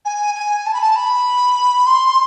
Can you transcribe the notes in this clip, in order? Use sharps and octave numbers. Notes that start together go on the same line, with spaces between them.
G#5
G#5
A5
B5
A5
B5
C6